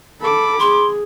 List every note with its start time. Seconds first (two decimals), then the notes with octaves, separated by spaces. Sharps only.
0.21 A4 B5 D6
0.60 G#4 C6